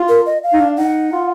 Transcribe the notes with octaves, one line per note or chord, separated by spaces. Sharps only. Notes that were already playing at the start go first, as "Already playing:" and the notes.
Already playing: F4
A#4
D#5
F5
D#4
D4
D#4 F#5
F4